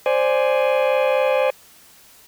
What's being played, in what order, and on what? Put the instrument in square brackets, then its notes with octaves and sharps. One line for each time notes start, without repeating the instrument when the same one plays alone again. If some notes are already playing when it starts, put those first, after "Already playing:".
[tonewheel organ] C5 D5 G#5